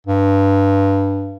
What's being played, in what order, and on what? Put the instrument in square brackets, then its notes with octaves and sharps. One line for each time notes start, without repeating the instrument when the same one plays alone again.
[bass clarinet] G2